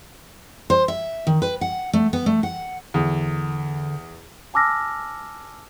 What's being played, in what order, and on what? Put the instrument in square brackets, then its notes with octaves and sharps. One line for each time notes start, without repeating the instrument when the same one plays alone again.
[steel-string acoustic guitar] C5
E5
D#3
B4
F#5
A3
B3
A3
F#5
[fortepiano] E2 [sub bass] D3
[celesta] G#5 A5 D6 E6 F6 A#6